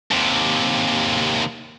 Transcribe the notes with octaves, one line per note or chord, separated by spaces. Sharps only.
D#2 C3